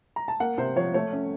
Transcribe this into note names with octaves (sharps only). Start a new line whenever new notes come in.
A#5
A5
A#3 F#5
C3 C5
F3 C#5
A3 C#5
C#4